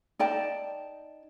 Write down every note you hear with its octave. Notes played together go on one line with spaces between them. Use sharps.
D#4 D5 G5 A5